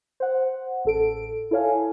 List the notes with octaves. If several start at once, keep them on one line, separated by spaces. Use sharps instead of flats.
C5 F#5
A1 A4 D7
E4 A4 C#5 F5 G#5